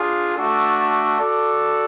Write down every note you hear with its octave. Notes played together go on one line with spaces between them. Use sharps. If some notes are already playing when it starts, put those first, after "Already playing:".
Already playing: D4 F4 G#4
A3 D4 F#4 A4
F#4 A4 D5